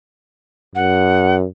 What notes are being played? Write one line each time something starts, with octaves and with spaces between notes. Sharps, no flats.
F#2 F#5